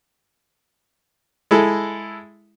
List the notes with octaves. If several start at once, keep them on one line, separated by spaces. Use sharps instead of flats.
G#3 E4 A4